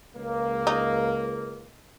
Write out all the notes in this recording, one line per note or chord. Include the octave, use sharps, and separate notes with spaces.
C#2 A#3
D#4